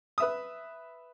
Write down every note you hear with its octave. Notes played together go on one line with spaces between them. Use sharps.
B4 E5 D#6